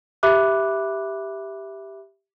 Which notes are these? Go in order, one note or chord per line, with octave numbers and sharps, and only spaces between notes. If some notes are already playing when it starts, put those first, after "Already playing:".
G4 E5 B5 D6 F#6